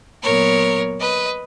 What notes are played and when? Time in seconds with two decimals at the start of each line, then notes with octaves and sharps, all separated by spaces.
0.23 A#2 F#3 B3 A#4 C#5
1.00 B4 D#5